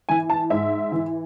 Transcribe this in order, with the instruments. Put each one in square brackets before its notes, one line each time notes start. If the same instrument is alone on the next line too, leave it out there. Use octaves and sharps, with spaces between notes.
[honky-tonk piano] E3 G#5
A5
G#2 E5
E3